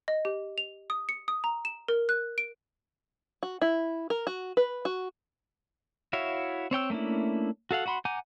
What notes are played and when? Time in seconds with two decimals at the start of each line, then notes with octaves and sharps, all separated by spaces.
0.08 D#5
0.25 G4
0.58 F7
0.90 D#6
1.09 C#7
1.28 D#6
1.44 A#5
1.65 E7
1.88 A#4
2.09 F#6
2.38 D7
3.43 F#4
3.62 E4
4.10 A#4
4.27 F#4
4.57 B4
4.85 F#4
6.13 E4 F#4 C#5 E5 F5
6.71 C4 C#5 G5 E6
6.90 A3 A#3 C#4 D4 E4
7.71 F#4 A4 F5 F#5
7.86 F#4 F#5 B5 C6
8.05 F#5 G#5 A#5 D6 G6